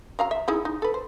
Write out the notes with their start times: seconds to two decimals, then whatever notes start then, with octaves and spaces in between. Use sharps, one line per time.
0.19 F#3 F5 A#5
0.31 E5
0.48 D#4 E4 G#4
0.65 D#4
0.82 A4 B4
0.94 C5